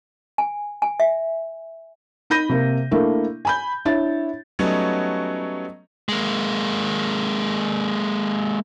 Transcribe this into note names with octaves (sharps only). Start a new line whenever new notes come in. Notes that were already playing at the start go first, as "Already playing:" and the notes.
G#5
G#5
E5
D#4 B5 G6 A#6 D#7
C3 A#3
A3 A#3 D4 E4
G#5 B5 G6
D4 E4 C#5 A6
F#3 G3 A3 B3 C#4 D#4
G#3 A#3